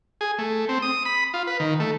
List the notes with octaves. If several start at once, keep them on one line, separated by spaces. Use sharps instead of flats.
G#4
A3
C4
D#6
B5
F4
B4
D#3
A3